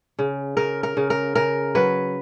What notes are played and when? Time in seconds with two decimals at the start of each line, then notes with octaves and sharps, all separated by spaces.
0.19 C#3
0.57 C#3 A#4
0.83 A#4
0.97 C#3
1.10 A#4
1.35 C#3 A#4
1.75 F#3 B4